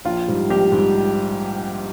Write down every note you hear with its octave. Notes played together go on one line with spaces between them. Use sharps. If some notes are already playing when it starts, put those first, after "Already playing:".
A#1 F4
G#2 G3
A#1 G4
G#2 G3